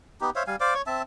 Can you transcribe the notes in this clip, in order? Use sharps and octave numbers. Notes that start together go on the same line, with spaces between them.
B3 D#4 G4
C5 C#5 E5 F5
G3 F5 G#5
C5 D5 F5 D6
C#5 C#6
C4 E5 A5